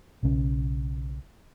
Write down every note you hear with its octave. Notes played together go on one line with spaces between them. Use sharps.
B1 C#3 C#4